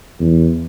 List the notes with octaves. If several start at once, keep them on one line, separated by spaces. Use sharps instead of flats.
E2